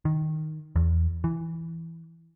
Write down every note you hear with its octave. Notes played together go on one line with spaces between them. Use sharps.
D#3
E2
E3